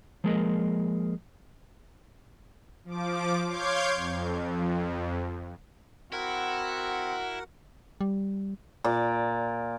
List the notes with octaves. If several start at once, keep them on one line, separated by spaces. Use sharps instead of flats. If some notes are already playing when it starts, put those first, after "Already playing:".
F3 G#3 A#3 G#4 A#4 D#5
F3 D6
C#5 F5 C6 D6 G6 G#6
F2
C4 E4 F#4 A#4 F#5
G3
A#2 D5